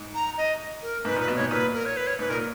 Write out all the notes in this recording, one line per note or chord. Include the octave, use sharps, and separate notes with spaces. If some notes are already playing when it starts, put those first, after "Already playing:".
Already playing: G#2
A#5
D#5
A#4
G#2 B4
A#2 B4
B2
G#2 C#5
A#2 B4
A#4
C#5
B4
C#5
G#2 B4
A#2 A#4